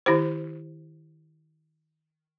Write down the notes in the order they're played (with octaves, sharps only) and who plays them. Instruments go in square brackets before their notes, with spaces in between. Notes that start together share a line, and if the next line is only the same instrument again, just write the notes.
[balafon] D#3 E4 G4 C5